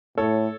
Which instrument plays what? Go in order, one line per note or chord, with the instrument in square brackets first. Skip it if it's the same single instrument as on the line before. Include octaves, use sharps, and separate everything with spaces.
[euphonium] A2 [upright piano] A4 C#5